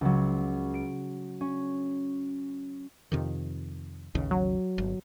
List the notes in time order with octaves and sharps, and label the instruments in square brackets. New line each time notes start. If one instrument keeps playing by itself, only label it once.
[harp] C#2 F#3
D7
C#4
[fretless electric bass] F2 C3 D#3
A1 D#2 C#3
[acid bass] F#3
[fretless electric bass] G1